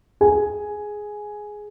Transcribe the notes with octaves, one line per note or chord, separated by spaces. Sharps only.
G#4 G#5